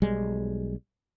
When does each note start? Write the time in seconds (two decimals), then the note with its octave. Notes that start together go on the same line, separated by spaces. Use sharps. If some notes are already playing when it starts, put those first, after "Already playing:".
0.02 B1 G3 G#3